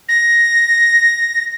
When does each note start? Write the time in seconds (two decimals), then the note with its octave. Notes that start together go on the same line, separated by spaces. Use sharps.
0.08 A#6